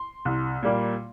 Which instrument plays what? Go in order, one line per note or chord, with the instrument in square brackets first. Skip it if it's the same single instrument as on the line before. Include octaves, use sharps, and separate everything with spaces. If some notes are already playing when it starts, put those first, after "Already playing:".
Already playing: [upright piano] C6
C2
A#2 G3 A#3